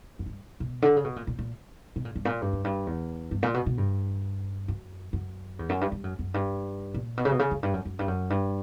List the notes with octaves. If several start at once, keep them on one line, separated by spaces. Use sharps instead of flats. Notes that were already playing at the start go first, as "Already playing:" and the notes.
F#2
G2
B2
D3
C#3
B2
A#2
A#2
A#2
B2
A#2
G2
A#2
G2
F#2
G2
E2
G2
A#2
B2
B2
G2
F#2
F#2
E2
F#2
G2
G2
F#2
F#2
G2
A#2
B2
C#3
B2
C#3
F#2
G2
F#2
F#2
G2
F#2
G2